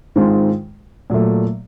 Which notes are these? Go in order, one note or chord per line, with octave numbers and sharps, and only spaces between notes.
G#2 D#3 G#3 C4 F4
A#2 F#3 A3